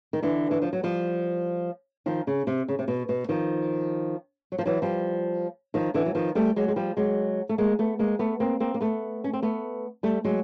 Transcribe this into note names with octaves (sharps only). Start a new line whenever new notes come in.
D#3
D3 E3
E3
F3
F#3
F3 G3
D#3 F3
C#3
C3
C#3
C3
B2
B2
D#3 F3
F#3
F3
E3 F#3
F3 G3
D#3 F3
D3 E3
F#3
D#3 F3
G3 A3
F#3 G#3
G#3
F3 G3
F#3 G#3
A3
G#3 A#3
A3 B3
G#3 A#3
A3 B3
A#3 C4
A#3 C4
A#3
A3 B3
C#4
C4
A3 B3
G3 A3
F#3 G#3